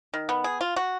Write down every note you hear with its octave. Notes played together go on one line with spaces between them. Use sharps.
D#3
B3
G#4
F4
F#4